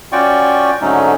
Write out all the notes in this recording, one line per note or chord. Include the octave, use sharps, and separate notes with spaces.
C#4 F4 F#4 D5 G5 C#6
G#2 D3 F#3 A3 C#4 D#4